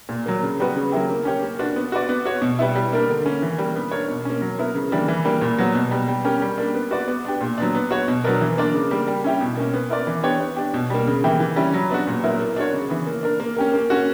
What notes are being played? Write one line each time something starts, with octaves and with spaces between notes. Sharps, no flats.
A#2
F#3 A#3
C#3
G3 B3 F#4 B4
C#3
F#3 A#3 E4 G4
A#3
C#4 G4 C#5
A#3
D4 F#4 B4
B3
F#4 B4 D5
B3
F#4 C#5
B2
G3 B3 E4
G3
A#3 D4 A#4
D3
A#3 C#4
E3
G3 A#3
B3
D4 A#4 C#5
B2
A#3 C#4
F#3
B3 E4 A#4
C#3
E3 G3 A#3 D4
E3
G3 A#3
A#2
F#3 B3 F#4
B2
G3 B3
G3
C#4 G4 A#4
G3
A#3 D4
B3
F#4 B4 D5
B3
D4 G4
A#2
F#3 B3 D4
B3
F#4 C#5
B2
F#3 B3 D4 A#4
E3
A#3 D4 A#4 D5
C#3
G3 A#3
G3
C#4 E4 G4
B2
A#3 C#4
B3
E4 A#4 D5
E3
B3 D4 G4 C#5
B3
D4 G4
B2
G3 A#3
C#3
E3 A#3 E4 G4
E3
G3 C#4 E4
F#3
B3 D4 F#4
A#2
F#3 B3 E4 A#4
A#3
D4 F#4 C#5
C#3
E3 B3
A#3
D4 A#4
A#3
C#4 G4 A#4
A#3
C#4 F#4